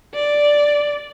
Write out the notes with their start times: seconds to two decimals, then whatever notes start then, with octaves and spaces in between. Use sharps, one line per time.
0.15 D5